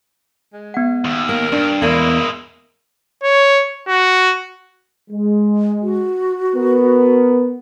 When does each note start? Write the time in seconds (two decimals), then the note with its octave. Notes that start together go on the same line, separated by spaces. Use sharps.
0.53 G#3
0.74 B3 F#5
1.05 D#2
1.29 A#3 A#4
1.52 G2 D4
1.82 E2 G#3 A#3 B3 E4
3.24 C#5
3.88 F#4
5.10 G#3
5.83 F#4
6.54 B3 A#4